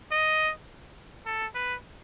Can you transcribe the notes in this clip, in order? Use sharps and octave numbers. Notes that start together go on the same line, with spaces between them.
D#5
A4
B4